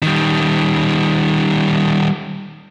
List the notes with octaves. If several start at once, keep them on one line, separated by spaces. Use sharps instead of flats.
D#3 G3